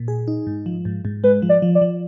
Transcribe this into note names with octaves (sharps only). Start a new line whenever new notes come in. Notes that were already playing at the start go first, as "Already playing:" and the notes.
Already playing: A#2
G#4
D#4
G#2
F3
G#2
G#2
G#3 B4
F3
D5
F3
D5
F3